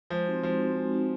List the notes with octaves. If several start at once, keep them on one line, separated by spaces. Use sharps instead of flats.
F3 G#3
C4 D#4 F#4
F3 G#3
C4 D#4 F#4
G#3
C4 D#4 F#4